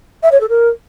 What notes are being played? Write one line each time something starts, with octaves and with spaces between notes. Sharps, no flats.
E5
C#5
A4
A#4